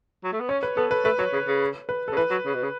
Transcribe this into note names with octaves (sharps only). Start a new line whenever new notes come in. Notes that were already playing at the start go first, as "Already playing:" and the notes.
F#3
A3
B3
C#4 C#5
B4
B3 A4
B4
A3 B4
F#3 C#5
C#3
C#3
B4
C#3 A4
E3 B4
F#3
C#3
B2
C#3